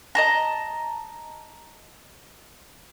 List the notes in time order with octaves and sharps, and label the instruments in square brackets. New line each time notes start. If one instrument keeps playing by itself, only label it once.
[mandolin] D#5 A5 A#5